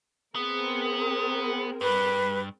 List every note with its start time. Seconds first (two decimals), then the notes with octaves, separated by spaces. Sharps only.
0.35 B3 C4 G#4 A#4
1.81 G2 B4